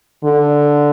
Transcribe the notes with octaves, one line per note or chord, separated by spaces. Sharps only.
D3